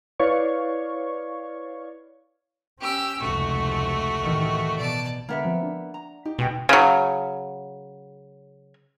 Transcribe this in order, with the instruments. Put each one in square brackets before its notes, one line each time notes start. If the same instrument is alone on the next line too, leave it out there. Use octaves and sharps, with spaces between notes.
[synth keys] E4 B4 C#5 D5 F5 C#6
[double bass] C#4 [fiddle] G4 E6
[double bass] F1 C#2 [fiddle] A3 F#4
[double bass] A1 D#3
[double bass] B2 [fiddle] D5 A5
[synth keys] D3 G#3 [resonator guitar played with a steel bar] A#3 B3 E5
[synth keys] F3 C4
D4
[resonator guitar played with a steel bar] A#5
[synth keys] D#4 [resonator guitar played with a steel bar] G4
[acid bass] B2 [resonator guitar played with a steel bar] G#3 B3 G5
[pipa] C#3 F#3